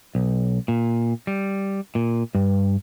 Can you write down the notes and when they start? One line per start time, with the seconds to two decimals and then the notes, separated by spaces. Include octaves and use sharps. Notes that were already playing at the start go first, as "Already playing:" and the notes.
0.15 B1
0.68 A#2
1.27 G3
1.95 A#2
2.35 G2